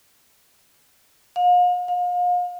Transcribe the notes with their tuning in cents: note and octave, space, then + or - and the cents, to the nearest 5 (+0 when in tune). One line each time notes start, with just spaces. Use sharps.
F5 +40
F5 +35